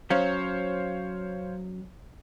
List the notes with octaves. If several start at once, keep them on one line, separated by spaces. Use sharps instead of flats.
F#3 C#4 C5 C#5 F5